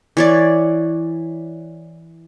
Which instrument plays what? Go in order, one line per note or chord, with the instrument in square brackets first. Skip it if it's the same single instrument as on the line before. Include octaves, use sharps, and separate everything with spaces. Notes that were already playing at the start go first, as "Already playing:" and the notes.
[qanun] E3 C#5 D5